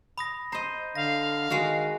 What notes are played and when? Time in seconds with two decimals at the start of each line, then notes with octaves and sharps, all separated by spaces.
0.18 B5 D#6 A#6
0.52 C5 D#5 A#5
0.95 D3 F5 A#6
1.50 D#3 G#3 F#4